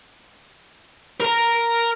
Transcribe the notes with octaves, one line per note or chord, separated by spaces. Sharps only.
A#4 A#5